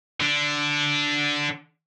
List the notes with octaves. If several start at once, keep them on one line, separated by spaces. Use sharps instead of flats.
D3 D4